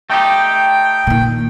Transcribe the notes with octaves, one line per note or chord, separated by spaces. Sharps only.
A3 D#4 G4 G5
A#2 D#3